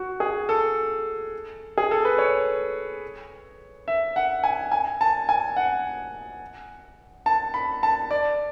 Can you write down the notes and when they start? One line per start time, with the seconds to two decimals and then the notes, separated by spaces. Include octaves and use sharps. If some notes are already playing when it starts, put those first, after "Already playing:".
Already playing: F#4
0.20 G#4
0.49 A4
1.78 G#4
1.91 A4
2.05 B4
2.18 C#5
3.88 E5
4.16 F#5
4.44 G#5
4.72 G#5
5.01 A5
5.29 G#5
5.56 F#5
7.26 A5
7.54 B5
7.83 A5
8.11 D5